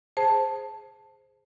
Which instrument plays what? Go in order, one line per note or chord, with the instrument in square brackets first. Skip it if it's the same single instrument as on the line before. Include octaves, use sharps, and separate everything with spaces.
[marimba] G#4 C5 A5